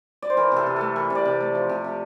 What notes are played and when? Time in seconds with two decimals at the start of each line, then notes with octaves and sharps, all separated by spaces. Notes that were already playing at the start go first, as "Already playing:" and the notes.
0.22 D5
0.30 C5
0.37 E3 A#4
0.52 C3 A4
0.66 C3
0.76 A3 A4
0.96 E3 A#4
1.10 C3
1.15 D5
1.25 C3
1.40 A3
1.55 F3
1.69 C3
1.84 C3